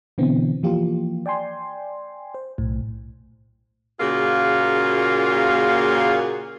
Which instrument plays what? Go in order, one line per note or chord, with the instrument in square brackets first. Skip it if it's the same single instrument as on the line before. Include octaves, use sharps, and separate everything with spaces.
[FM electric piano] B2 D3 E3 B3 C4
E3 F3 A#3 F4 G4
D5 G5 G#5 C6
C5
B1 A2
[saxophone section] A#2 C#3 A#3 F4 F#4 G#4